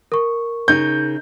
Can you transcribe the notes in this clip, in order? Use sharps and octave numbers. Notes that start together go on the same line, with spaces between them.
A#4 C#6
C#3 D#4 G6